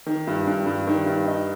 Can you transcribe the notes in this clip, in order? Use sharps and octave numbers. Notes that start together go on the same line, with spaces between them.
D#3
G2
G2
G2
D#3
G2
D#4